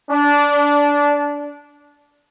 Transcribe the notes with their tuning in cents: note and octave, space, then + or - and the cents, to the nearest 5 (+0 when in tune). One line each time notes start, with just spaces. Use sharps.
D4 -15